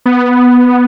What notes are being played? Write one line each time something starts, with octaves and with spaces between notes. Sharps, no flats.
B3